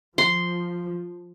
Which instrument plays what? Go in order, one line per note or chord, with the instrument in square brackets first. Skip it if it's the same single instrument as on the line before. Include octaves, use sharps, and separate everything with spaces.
[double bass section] F3 [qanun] C6